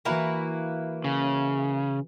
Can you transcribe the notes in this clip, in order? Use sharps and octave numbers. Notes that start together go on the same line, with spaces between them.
E3 A#3 E4 F#4 B4 A#5
C#3